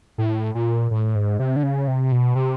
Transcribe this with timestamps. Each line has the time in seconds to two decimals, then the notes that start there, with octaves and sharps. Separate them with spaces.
0.18 A2
0.55 A#2
0.91 A2
1.15 G#2
1.39 C3
1.56 D3
1.63 C#3
1.88 C3
2.12 B2
2.35 C3